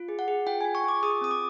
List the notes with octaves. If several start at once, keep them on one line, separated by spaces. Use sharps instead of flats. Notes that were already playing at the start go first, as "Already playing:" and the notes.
Already playing: F4
G#4
F#5
G#4
F4 G5
F4 G#5
C#6
F4 D6
G#4 D#6
C4 D#6
D6